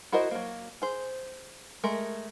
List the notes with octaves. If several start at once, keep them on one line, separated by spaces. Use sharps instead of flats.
E4 F#4 A#4 C5 D#5
F#3 A#3
G#4 C5
G#3 A3 A#4